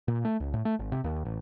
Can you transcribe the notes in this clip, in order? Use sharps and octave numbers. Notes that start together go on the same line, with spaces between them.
A#2
A3
C#2
A2
A3
G#1
C3
D#2
A1